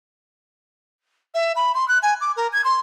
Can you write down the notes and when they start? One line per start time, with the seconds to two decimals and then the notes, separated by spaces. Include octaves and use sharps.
1.34 E5
1.56 B5
1.75 C6
1.88 F#6
2.03 G#5
2.21 D6
2.36 A#4
2.53 G#6
2.65 C6